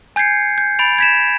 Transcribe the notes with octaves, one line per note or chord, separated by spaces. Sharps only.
G#5 G6 G#6 C7 C#7
G6
B5 A6 D7 F7
G#6 B6 E7